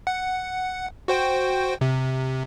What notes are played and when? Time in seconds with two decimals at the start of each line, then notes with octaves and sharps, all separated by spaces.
0.07 F#5
1.08 F#4 C5 G5
1.81 C3